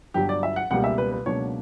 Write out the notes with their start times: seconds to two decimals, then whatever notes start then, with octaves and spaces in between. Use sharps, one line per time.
0.14 G1 G2 F#3 G4
0.29 D5
0.43 E5
0.56 F#5
0.71 C#2 B2 G3 A#3 F#5
0.84 E5
0.98 B4
1.12 B4
1.26 C#2 B2 F#3 A#3 D4 C#5